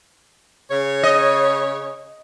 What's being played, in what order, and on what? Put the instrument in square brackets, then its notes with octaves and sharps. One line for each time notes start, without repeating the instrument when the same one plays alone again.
[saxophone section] C#3 C#5
[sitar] D#5